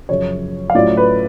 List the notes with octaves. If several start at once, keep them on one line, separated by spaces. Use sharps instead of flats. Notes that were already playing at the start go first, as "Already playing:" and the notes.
F#2 C#3 F3 C#5
F5
A2 F#3 C#4 F4 D5
B4